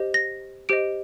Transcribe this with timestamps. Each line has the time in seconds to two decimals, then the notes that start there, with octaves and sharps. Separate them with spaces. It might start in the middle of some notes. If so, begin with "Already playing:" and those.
Already playing: G4 C5 D#5
0.14 A#6
0.69 G4 C5 D#5 D7